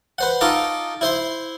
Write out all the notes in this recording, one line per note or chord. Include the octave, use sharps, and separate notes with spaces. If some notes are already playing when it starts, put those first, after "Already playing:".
B4 C5 F#5
D#4 F4 A4 D#5 D6
E4 C5 C6